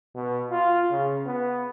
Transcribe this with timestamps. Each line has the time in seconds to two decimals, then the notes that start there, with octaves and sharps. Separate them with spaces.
0.15 B2
0.51 F4
0.91 C#3
1.26 B3